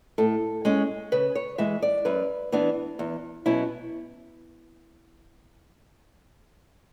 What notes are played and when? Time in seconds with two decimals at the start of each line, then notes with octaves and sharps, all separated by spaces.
0.18 A2 A4
0.65 G#3 C#4
1.12 C#3 B4
1.35 C#5
1.58 E3 G#3 E5
1.82 D5
2.05 F#2 B4
2.52 E3 B3 D4
2.99 E2
3.46 B2 F#3 C#4 E4